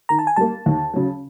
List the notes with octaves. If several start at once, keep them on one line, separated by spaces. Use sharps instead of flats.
D#3 A#5
A5
G#5
G3 A#3 A5
D#2
C#3 F#3